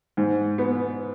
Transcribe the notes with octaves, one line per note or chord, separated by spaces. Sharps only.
G#2
B3